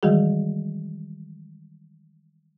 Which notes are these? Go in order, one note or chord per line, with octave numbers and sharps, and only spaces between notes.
D#3 E3 G3 G#3 F#4 G#4